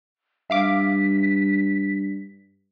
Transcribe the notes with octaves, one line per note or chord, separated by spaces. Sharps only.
G2 E5 F5 D6 B6